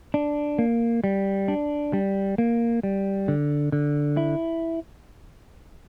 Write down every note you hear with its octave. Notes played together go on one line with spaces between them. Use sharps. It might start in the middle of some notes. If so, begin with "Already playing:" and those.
D4
A#3
G3
D4
G3
A#3
G3
D3
D3
E4